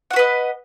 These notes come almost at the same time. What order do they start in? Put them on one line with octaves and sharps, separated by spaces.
F#5 F#4 B4 D#5